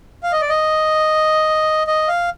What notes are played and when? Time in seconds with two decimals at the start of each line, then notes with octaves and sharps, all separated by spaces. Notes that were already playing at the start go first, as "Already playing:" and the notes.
0.23 F5
0.32 D#5
0.41 D5
0.50 D#5
1.87 D#5
2.08 F5